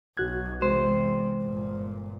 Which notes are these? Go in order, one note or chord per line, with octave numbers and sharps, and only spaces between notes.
B1 F#4 F#6 G#6
E2 C3 G#3 C5
G1 A#2